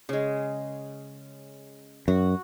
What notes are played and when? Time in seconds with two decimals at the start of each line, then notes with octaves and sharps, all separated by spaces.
0.09 C#3 G#3
2.08 F#2 F#4